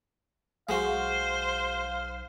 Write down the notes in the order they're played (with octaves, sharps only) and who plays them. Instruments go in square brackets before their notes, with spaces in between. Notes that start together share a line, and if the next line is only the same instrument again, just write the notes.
[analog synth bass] B1 [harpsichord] G#3 F#4 [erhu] C5 [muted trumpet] F5